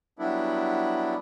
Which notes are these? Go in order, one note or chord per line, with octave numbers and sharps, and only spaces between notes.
F#3 G3 B3 D4 E4